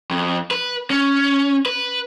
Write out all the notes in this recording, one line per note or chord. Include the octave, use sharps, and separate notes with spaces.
F2
B4
C#4
B4